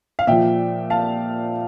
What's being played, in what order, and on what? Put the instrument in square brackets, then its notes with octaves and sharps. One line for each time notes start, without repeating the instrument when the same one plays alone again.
[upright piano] F5
A#2 F3 E5 G5
F5 A5